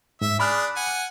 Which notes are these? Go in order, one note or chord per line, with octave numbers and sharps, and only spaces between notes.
G#2 E5
D4 G#4 D5 B5 F6 F#6
F#5 G#5